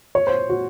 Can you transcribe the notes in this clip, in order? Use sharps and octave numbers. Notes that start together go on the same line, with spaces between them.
C#5
C5
F#4